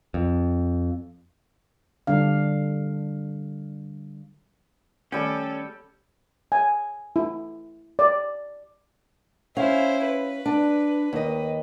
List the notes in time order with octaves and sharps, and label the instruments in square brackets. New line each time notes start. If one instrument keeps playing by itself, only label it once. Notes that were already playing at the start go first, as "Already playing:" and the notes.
[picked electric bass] F2
[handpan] D3 G3 D4 F5
[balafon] D#3 A3 D5 [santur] G3 G5 [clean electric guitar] C#4 [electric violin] A4
[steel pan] G#5
E4
D5
[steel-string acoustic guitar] C#4 F5 [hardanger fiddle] E4 C5
[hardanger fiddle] B4
[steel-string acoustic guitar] D4
D#2 D#5